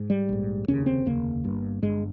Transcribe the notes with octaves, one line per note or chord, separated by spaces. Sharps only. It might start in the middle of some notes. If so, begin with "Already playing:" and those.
Already playing: G#2
G3
A#1 G#2
F1 D#2 C#3 C#4
C4
F1 D#2 C#3 A#3
G1 G2
G1 G2 G#3